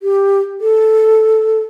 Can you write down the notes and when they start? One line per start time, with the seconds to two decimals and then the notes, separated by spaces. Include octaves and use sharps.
0.03 G4
0.61 A4